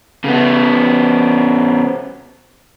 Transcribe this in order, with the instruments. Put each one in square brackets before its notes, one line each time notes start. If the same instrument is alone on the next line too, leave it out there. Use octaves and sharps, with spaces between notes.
[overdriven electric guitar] C#3 B3